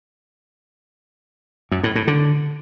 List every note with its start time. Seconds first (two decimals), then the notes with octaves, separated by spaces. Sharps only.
1.71 F#2
1.83 A2
1.95 A2
2.07 D3